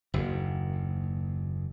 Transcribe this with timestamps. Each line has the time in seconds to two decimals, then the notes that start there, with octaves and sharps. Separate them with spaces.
0.14 F#1 D#2